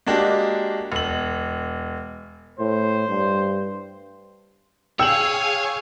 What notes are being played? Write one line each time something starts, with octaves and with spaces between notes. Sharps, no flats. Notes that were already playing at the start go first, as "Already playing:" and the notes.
G#3 A#3 D4 F#4 G4
E1 F#7
A2 C5
G2
G#4 C#5 F5 G5 G#5 E6 E7 F#7